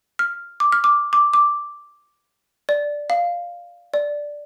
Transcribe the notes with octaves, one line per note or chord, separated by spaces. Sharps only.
F6
D6
F6
D6
D6
D6
D5
F5
D5